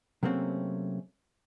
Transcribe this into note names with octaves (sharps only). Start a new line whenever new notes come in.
C3 F#3 A3 A#3 C4 C#4